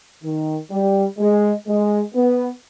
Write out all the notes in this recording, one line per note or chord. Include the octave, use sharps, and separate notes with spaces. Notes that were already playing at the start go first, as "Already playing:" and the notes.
D#3
G3
G#3
G#3
B3